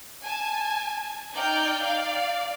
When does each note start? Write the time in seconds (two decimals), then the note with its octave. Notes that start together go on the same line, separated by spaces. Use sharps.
0.22 G#5 A5
1.33 D#4 D5 G5 F6 G6
1.83 D5 F5